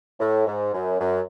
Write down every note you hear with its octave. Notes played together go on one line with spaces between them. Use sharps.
A2
G#2
F#2
F#2